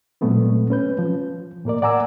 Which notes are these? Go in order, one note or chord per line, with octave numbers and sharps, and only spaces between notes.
A#2 F#3 G#3 A3 B3 C4
C#4 B4 G6
F3
A2 A#3 A#4 D5
D5 F#5 G#5 A#5 D6 E6